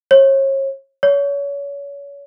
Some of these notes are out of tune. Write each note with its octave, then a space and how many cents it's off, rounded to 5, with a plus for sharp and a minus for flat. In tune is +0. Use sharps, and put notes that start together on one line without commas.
C#5 -35
C#5 +30